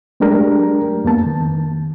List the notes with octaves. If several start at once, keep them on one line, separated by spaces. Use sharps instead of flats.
F#3 G#3 A3 D4 G4 A#4
F2 A#3 B3 A5
D#3